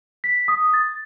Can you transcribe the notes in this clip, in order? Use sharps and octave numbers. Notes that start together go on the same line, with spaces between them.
B6
D#6
A6